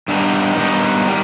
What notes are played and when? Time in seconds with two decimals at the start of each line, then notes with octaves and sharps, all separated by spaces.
0.08 G2 D#3 G3 B3 D#4
0.56 G2 D#3 G3 B3 D#4
1.07 D#3 G3